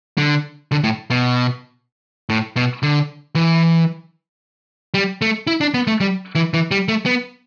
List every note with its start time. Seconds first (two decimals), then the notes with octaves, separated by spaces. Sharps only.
0.18 D3
0.72 D3
0.84 A2
1.10 B2
2.30 A2
2.56 B2
2.83 D3
3.35 E3
4.94 G3
5.22 A3
5.47 E4
5.61 D4
5.74 B3
5.87 A3
6.00 G3
6.35 E3
6.54 E3
6.71 G3
6.88 A3
7.06 B3